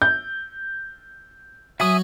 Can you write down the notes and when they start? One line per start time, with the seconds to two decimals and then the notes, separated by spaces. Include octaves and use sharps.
0.02 G6
1.80 F#3 F#4 E5 G#5 D#6